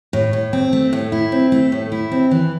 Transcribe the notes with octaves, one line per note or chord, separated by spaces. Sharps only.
A2
A2
C4
A3
A2
E4
C4
A3
A2
E4
C4
E3